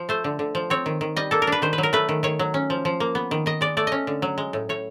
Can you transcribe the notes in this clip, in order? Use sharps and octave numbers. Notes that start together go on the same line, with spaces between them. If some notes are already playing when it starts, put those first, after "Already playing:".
Already playing: F3
A3 C5
D3
D3
F3
C4 C#5
D#3
D#3
G3 D#5
A#3 A4
A#4
D4
B4
D#3 C5
B4
F#3
A#4
A3 B4
D#3
D#3 C#5
F#3
C#4
F3
F3
A#3
B3
D#3
D#3 D#5
G#3 D5
A3 D5
C#4 D#5
D3
F#3
G#3
A2
A2 C#5